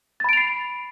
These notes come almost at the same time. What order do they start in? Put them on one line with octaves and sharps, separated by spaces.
A6 B5 D7 F7 C7